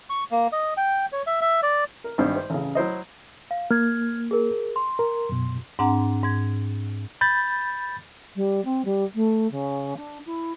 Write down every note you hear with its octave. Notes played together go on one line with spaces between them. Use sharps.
C#6
A#3
D#5
G5
C#5
E5
E5
D5
A#4
G#1 G2 C5
C5
A1 C#3
F#3 E4 C5 D#5
F5
A#3 F6 G#6
G#4 A#4
C6
A#4
F#2 B2
G#2 C4 D4 F#5 A#5
G#2 G#6
B5 G6 A6
G3
C4
G3
A3
C#3
D4
E4